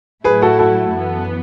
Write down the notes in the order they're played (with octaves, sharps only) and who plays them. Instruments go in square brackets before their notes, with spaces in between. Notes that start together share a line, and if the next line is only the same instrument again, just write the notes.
[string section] A2 F#3 A3 E4 [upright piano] G#4 B4
[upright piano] F#4 A4
F#4 A4
[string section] F#2 E3 B3